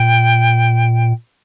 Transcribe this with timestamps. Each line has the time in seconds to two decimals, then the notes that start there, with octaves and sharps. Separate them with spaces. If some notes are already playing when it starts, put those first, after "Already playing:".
Already playing: A#2 G5